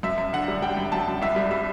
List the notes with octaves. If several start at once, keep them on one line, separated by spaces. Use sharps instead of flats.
F#2 E5
F#2
D3 F#5
G3
G3 G5
F#2
F#2 A5
F#2
C2 E5
G3
G3 E5